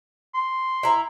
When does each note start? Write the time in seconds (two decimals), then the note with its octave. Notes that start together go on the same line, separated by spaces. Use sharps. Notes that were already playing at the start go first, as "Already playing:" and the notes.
0.34 C6
0.83 E4 A#5